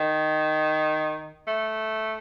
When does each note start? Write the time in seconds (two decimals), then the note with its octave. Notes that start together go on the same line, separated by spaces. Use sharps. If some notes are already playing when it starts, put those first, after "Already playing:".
Already playing: D#3
1.47 A3